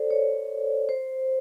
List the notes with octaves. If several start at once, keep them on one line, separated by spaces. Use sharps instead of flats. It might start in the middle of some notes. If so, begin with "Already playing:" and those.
Already playing: A4 C5 D5
C#5
C5